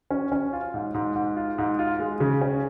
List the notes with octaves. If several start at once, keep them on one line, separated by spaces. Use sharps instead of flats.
C#4
C#4
F4
G#2
G#2
G#2
F4
G#2
F4
G#3
C#3
C#4